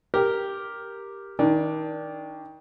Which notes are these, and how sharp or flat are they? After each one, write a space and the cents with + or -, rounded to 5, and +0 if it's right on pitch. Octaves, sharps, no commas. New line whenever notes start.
G4 +0 A#4 +0
D#3 +25 D4 +0